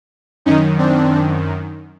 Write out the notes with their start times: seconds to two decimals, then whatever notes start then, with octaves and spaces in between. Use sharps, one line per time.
0.46 F#2 D#3 C#4 D#4
0.78 C4 D4